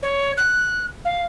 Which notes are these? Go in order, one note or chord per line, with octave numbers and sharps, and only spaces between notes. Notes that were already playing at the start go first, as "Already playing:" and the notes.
C#5
F#6
F5